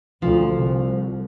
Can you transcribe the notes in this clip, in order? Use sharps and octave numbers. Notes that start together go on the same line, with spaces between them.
D2 F3
C2